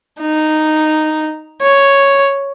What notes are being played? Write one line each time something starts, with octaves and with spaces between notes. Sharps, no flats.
D#4
C#5